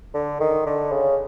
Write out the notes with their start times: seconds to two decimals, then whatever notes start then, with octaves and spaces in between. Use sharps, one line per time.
0.14 D3
0.40 D#3
0.66 D3
0.92 C#3